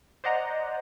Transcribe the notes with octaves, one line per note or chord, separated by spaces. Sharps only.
C5 D5 D#5 F#5 A#5